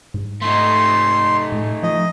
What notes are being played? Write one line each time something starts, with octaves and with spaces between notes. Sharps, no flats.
G#2
A3 D#4 C6
A2
F3 D#5